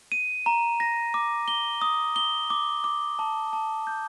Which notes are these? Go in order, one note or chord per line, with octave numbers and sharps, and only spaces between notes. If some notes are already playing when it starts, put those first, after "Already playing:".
D#7
A#5
A#6
D6
G7
D#6
G7
D6
D6
A5
A5
G6